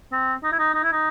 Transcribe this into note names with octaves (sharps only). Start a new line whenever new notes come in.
C4
D#4
E4
D#4
D#4
E4
D#4